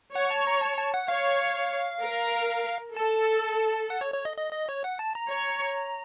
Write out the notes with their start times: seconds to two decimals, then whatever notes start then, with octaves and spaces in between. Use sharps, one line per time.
0.15 C#5 F#5
0.30 A5
0.47 A#5
0.61 A5
0.77 A5
0.94 F#5
1.08 C#5 F5
2.03 A#4
2.96 A4 A5
3.90 F#5
4.01 C#5
4.14 C#5
4.25 D#5
4.37 D#5
4.53 D#5
4.69 C#5
4.84 F#5
4.99 A5
5.15 A#5
5.30 C#5